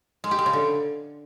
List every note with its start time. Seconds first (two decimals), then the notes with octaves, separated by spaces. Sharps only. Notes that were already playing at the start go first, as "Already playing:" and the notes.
0.24 G#3
0.31 G4
0.39 G#3
0.46 C#3
0.53 D3